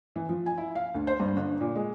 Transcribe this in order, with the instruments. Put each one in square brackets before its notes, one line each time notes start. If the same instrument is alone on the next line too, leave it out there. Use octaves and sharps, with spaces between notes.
[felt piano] E3
F3
G#5
E4
F5
D2
C5
G2
G1
A#2
G#3